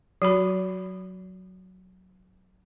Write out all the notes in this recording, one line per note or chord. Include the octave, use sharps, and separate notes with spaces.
F#3 F#4 B5